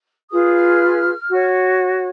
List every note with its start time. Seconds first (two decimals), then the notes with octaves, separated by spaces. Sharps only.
0.30 F4 G#4 B4 D#6
0.55 F6
1.29 F#4 C#5